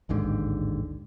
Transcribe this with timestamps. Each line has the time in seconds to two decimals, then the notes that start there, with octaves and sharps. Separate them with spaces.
0.09 A1 D#2 G#2 D3